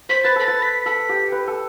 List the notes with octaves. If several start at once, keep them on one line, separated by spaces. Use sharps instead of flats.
C5 B6
B4 A6
A4 B6
B4 A6
B6
A4 B6
G4
B4
A4